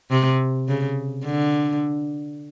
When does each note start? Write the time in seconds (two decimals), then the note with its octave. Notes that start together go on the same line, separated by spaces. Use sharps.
0.11 C3
0.68 C#3
1.25 D3